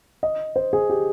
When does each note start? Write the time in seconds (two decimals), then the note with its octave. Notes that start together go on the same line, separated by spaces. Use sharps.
0.23 D#5
0.56 C5
0.73 G#4
0.90 G4